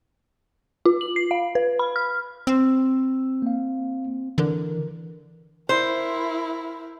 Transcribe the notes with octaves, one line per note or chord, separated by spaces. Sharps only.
F4
F#7
C7
F5
B4
B5
F6
C4 E6
A#3 F5
D3 E3 A#4
E4 A#4 C5